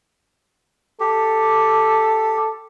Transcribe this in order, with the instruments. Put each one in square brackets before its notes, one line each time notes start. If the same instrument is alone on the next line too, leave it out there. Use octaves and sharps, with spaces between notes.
[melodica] G4 [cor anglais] A4